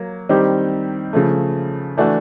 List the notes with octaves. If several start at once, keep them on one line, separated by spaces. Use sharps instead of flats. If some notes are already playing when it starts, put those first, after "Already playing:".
Already playing: F#3 A#3
D#3 G3 C4 D#4 G4
C#3 F3 A3
E3 A3 D4 F#4